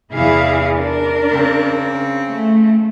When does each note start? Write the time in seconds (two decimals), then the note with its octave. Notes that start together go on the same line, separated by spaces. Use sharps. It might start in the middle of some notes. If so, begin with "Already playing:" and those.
0.13 E2 C3 E4 G#4 F5
0.75 D4 A#4
1.30 C#3 C4
2.29 A3